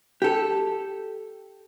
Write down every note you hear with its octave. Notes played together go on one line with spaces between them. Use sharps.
G4 A4